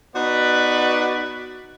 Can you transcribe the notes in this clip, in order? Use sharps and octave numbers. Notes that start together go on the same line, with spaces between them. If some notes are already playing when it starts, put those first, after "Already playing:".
B3 D#4 F#4 B4 D5